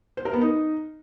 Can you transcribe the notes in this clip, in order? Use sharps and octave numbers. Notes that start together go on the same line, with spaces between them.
C5
A#4
B3
D#4